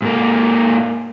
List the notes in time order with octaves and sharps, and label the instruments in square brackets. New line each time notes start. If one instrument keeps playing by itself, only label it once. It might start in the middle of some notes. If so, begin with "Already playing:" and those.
[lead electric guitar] G#2 A#3